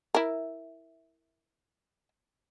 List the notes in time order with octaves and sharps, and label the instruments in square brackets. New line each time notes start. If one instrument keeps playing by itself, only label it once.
[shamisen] E4 A#4